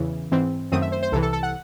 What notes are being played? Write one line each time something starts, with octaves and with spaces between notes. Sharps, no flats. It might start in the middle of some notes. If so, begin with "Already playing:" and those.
Already playing: E2 C#3 E3
G#2 E3 C4
F#2 D#3 A3 C4 D#6
E5
C5
C5
C2 C3 E3 A4
A4
A4
F#5